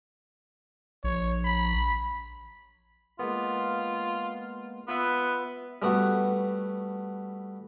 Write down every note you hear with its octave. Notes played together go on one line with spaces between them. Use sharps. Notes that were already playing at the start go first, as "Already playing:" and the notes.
A#1 C#5
B5
G#3 A#3 B3 F4
B3 F4 B4 E5
G3 A3 B3 F#4